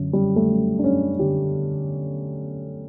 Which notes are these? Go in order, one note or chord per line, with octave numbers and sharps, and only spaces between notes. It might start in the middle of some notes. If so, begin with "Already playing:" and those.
Already playing: F#2 D3
F#2 G3
A3
F#2
D4
F#2 C#4
D3 G4